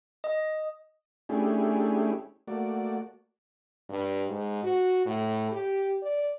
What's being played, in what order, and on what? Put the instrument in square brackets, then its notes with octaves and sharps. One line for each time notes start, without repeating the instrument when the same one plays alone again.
[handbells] D#5
[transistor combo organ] A3 C#4 D4 E4 G4 G#4
A3 A#3 F#4 D5
[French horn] G2
G#2
F#4
A2
G4
D5